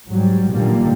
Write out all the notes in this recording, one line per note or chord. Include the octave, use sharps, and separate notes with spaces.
G#2 F#3 G3
A#2 D3 D#3 G3 A#3